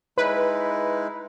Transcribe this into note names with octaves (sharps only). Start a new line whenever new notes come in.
G#3 D#4 E4 B4